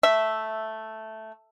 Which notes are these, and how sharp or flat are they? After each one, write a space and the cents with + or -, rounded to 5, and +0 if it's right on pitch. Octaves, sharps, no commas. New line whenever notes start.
A3 +0 E5 -5